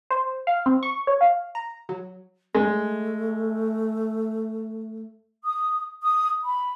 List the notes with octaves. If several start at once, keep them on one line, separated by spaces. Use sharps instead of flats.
C5
F5
C4
C#6
C#5
F5
A#5
F#3
G#3 A3
D#6
D#6
B5